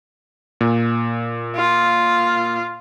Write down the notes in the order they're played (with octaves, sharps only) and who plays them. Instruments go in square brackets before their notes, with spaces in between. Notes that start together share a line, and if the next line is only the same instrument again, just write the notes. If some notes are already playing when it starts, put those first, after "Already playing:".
[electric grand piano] A#2
[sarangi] F4